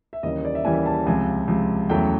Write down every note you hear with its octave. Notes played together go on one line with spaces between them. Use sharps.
E5
D#2 C#3 E3 G3 A#3 D#5
D5
E5
D#2 C#3 E3 G3 A#3 G#5
A5
C#2 C3 F3 G#5
C#2 C3 F3
E2 C#3 F#3 A3 G5